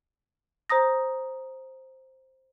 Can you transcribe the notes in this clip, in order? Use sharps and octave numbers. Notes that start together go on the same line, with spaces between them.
C5 A#5 D#6 A#6